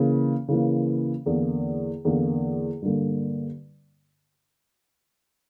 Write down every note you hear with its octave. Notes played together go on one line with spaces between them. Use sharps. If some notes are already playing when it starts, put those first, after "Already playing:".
Already playing: C#3 E3 A#3
C#3 E3 A#3
E2 D3 A#3
E2 D3 A#3
G2 D3 A#3